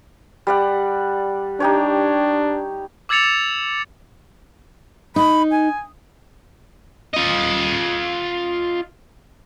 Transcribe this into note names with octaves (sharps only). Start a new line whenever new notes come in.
G3 D5 F#5
D4 D#4 G4 C#5
D6 E6 G#6 A6 C#7 F7
D#4 B5
G#5
F4 D#5